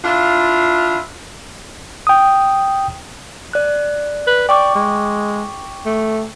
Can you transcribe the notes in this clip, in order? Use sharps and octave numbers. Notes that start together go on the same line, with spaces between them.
D4 E4 F4
G5 D#6
D5 F#6
B4
D5 G5 C#6 D6
G#3
A3